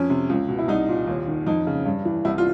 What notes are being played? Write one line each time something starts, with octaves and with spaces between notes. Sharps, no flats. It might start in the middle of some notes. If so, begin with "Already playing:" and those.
Already playing: F2 C#4
C3
C#2
B2
E4
C2 D#4
A#2
D#2
D#3
F2 D#4
C#3
G2
E3
C2 E4
F4